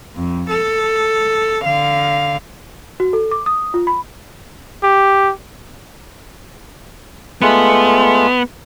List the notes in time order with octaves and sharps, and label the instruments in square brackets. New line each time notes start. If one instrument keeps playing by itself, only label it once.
[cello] F2
A4
D3 F5
[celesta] F#4
A4
D6
D#6
F4
B5
[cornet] G4
[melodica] G#3 A3 F4 [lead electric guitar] B3